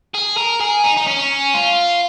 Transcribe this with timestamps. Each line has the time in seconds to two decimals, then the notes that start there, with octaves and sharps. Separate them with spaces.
0.14 G#4
0.37 A#4
0.60 G#4
0.84 D#4
0.96 D#4
1.07 C#4
1.54 F4